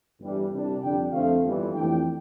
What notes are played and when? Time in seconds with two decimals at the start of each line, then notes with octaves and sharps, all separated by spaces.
0.20 G1 G2 E3 G3 D4
0.51 C2 C3 G3 D4
0.81 F2 D3 G3 D4 G5
1.12 F2 D3 F3 A3 C4 F5
1.42 G1 F2 E3 G3
1.73 G1 F2 E3 A3 D4 G5